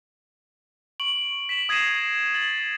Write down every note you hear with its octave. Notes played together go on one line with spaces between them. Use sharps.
C#6 D7 F#7
B6 E7 F#7
D#6 G#6 A#6 C7 D#7 E7
A6 F#7